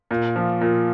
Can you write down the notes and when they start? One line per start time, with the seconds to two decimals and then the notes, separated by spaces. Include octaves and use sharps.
0.11 A#2
0.36 F3
0.61 A#2